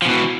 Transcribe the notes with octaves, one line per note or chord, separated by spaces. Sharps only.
B2 E3 F3